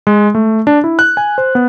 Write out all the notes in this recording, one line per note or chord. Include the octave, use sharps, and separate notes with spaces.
G#3
A3
D4
E4
F#6
G#5
C5
B3